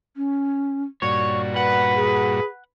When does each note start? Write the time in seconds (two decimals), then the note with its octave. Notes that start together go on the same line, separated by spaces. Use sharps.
0.17 C#4
1.02 G2 A#2 F#4 C#5 D5
1.57 B4 F#5
1.95 G#4